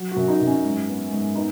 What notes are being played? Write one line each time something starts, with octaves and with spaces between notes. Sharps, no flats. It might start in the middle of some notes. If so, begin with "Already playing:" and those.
Already playing: F#3
F#4
F#2
D#4
F#2
C#4
G#2
B3
G#2
B3 D#4